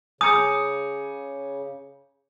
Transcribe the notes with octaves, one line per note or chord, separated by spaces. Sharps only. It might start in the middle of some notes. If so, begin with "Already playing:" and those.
C#3 G#5 A#5 D6 D#6 G6 C#7